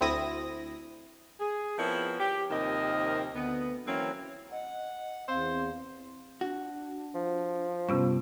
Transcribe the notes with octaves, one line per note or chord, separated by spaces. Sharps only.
D2 C4 E4 D#6 A#6
G#4
F3 B3 C4 E4 A#4 C#5
G4
D#2 C3 D#3 F3 A#4 D#5
D2 B3
E3 F#3 A#3 C4 C#4 E4
D#5 F#5
E2 C4 C5 F5
D4 F#4
F3
G2 C3 B3 C#4 F4